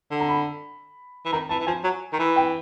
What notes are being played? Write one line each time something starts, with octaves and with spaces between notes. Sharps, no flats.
D3
A#5
B5
E3
D#3 A#5
E3 A5
E3
F3 G#5
F#3
D#3
E3
G5